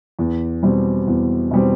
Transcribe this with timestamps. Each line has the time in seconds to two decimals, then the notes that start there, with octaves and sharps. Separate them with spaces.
0.19 E2
0.63 B2 G3 C4
1.08 E2
1.51 B2 G3 C4